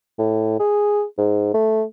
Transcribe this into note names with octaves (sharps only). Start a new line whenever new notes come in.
A2
G#4
G#2
A3